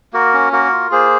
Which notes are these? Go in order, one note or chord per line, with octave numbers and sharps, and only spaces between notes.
A#3 F#4 A#4
C#4
A#3 F#4 A#4
F4
A#3 G#4 C5